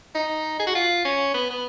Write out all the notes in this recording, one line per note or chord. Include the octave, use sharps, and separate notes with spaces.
D#4
G#4
F#4
F4
C#4
B3
B3